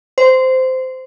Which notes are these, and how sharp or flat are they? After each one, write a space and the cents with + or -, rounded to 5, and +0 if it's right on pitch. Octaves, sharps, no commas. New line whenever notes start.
C5 -15